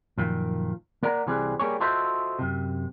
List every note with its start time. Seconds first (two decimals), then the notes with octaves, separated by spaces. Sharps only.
0.18 F#2 A#2 D#3 F3
1.03 A#3 A#4 D5 F#5 A#5
1.27 C2 E3 G3 C4 G#4
1.59 G3 A#3 G#4 C#5
1.80 F4 F#4 A4 C5 D#5 E5
2.39 F#2 C3